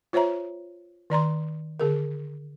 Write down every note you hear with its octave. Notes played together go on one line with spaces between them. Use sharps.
F4 C5 C#5 E5 A#5
D#3 D5 A#5 C6
D3 G#4 A#4